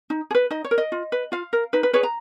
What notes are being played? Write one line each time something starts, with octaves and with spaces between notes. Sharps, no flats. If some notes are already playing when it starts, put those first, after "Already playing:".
D#4
G#4
B4
D#4 D#5
C#5
A#4
D#5
F4
B4
F4 F5
A#4
D#4 B4
B4
G#4 B4 C#5
A#5